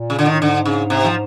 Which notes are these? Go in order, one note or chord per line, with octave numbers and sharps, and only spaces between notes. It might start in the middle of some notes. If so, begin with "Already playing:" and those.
Already playing: A#2
C#3
D3
A2 D#3
G#2 D3
C#3
C3
F3